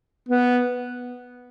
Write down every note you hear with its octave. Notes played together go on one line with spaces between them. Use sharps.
B3